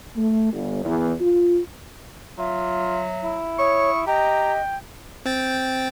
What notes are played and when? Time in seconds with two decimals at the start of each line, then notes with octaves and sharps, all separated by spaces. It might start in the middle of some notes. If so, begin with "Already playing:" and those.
0.16 A3
0.52 G1
0.84 E2
1.20 F4
2.38 F#3 F4 E5
3.24 E4
3.59 C#5 C#6 D#6
4.07 G4 D#5 G5 A#5
5.25 C4 G5 A6